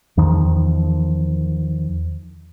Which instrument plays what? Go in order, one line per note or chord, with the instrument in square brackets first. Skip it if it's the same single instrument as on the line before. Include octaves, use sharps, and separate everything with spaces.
[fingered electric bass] E2 D#3 F3